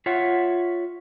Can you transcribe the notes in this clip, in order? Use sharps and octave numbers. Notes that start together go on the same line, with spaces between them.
F4 C#5 E5 F#5